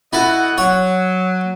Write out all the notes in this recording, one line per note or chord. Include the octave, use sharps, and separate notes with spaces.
E4 F#4 A4 D#5 F#5
F#3 C#5 F#5